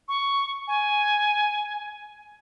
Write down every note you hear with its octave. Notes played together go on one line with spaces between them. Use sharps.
C#6
G#5